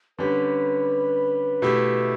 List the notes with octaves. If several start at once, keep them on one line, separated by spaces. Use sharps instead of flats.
D3 G3 C#4 G4 B4
B2 A3 E4 G4